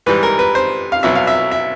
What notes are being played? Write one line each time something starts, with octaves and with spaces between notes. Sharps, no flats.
G#2 E3 G3 B4
A#4
B4
C5
F5
C2 B2 F#3 E5
F5
E5
E5